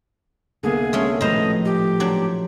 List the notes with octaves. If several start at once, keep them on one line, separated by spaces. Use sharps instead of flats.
C2 D3 A#3 B3 G#4
G#3 A3 C#4 E5 D#6 F6
A#1 A2 D#3 F3 B4 C5 D#5 A#5
G4
F#3 D4 C5 D5